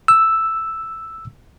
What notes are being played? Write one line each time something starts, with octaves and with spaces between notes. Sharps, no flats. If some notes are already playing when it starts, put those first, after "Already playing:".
E6